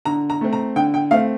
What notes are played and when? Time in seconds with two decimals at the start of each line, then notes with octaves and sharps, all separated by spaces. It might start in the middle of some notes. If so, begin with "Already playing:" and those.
0.05 D3 A#5
0.30 A#5
0.41 A3 C4
0.53 A#5
0.76 D3 G5
0.94 G5
1.11 A3 C4 F5